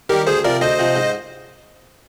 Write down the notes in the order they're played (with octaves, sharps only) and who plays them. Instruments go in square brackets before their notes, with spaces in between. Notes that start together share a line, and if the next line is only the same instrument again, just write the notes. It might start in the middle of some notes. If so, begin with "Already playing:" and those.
[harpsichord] D#3 G3 [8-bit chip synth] G4 A#4
[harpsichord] D2 [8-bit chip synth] G#4 C5
[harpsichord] C3 F3 [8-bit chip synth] A#4 D5
[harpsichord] D2 [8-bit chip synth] C5 D#5
[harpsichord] C3 F3
G#2